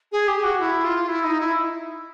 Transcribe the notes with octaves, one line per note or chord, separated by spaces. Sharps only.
G#4
G4
F#4
E4
F4
E4
D#4
E4